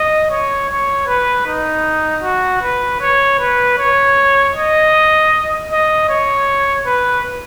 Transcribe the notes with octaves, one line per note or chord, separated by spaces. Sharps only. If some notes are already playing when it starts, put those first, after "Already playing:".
Already playing: D#5
C#5
C#5
B4
D#4
F#4
B4
C#5
B4
C#5
D#5
D#5
C#5
B4